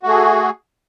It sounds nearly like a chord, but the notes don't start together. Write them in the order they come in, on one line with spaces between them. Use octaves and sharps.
F#4 A3 G#4